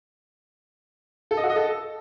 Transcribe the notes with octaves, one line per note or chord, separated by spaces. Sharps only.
A4
D#5
F#4
D#5
A4